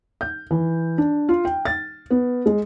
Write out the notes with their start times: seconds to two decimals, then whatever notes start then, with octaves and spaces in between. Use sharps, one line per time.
0.21 G6
0.51 E3
0.98 D4
1.29 F4
1.45 G5
1.65 A6
2.11 B3
2.46 G#3